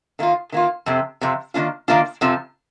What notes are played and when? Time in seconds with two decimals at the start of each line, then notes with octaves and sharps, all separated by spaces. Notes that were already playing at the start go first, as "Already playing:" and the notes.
0.19 D#3 A#3 F4
0.52 D#3 A#3 F4
0.86 F2 C3
1.21 F2 C3
1.54 D#3 A#3 D4 F4
1.88 D#3 A#3 D4 F4
2.21 F2 C3 F3